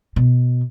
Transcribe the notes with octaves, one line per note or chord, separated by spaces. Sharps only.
B2